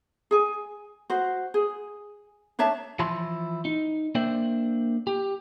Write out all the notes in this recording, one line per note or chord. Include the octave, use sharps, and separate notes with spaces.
G#4 G#5
F#4 C5
G#4
D4 C#5 E5 A5
E3 F3 E4 A5 C6
D#4
A#3 D4 C5 D5 E5 G5
G4